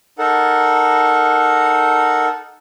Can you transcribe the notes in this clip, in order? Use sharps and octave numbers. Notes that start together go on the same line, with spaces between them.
D#4 A4 A#4 F#5